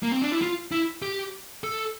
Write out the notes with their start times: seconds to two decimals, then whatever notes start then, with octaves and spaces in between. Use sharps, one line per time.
0.03 A#3
0.12 C4
0.22 D4
0.32 E4
0.42 F4
0.72 E4
1.02 G4
1.64 A4